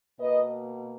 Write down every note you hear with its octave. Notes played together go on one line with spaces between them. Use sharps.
B2 A#3 B4 D#5